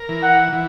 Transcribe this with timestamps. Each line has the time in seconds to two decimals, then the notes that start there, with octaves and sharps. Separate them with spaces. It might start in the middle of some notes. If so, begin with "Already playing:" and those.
Already playing: A#4
0.09 E3
0.23 F#5
0.52 E3